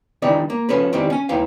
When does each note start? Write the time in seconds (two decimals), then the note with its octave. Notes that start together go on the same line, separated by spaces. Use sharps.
0.22 D#3 E3 G3 D4 D#4
0.50 A#3
0.69 F3 C#4 A4 B4
0.93 D#3 E3 G3 C4
1.10 C#4 G#5
1.29 D#2 D#3 E3 F5